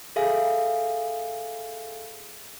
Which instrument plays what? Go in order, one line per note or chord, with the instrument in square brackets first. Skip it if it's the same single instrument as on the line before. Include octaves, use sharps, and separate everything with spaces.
[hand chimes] G#4 A4 E5 F5 G#5